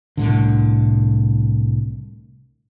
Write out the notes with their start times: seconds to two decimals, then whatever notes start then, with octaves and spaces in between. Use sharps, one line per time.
0.17 C2 A2 D3